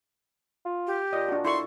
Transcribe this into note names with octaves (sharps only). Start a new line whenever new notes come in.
F4
G4
A#2 D#5
D4 F#4
E4 A4 C6 C#6